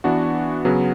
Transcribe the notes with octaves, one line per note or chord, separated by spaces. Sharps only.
E3 B3 D4 F#4
C#3 F#3 B3